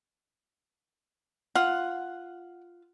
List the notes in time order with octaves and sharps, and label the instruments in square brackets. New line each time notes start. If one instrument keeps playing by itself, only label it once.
[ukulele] F4 [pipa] F#5